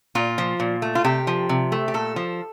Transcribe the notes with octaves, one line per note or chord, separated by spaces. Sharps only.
A#2 F4
F3
A#2
A3
F4
C3 G4
F3
C3
A3
G4
A#2 A4
F3